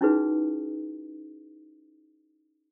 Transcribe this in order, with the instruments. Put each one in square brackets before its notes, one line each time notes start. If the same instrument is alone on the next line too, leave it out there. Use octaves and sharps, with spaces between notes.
[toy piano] C#4 D#4 E4 F#4 G#4 B4